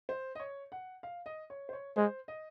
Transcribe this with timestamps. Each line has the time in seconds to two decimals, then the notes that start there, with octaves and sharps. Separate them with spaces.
0.09 C5
0.35 D#5
0.40 C#5
0.72 F#5
1.03 F5
1.26 D#5
1.50 C#5
1.69 C5
1.73 C#5
1.97 G#3 C5
2.28 D#5